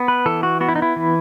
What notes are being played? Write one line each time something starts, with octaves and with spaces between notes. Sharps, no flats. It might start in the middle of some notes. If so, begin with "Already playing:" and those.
Already playing: B3
B4
E3 A4
F#4
B3 F#4
E4
D#4
E4
E3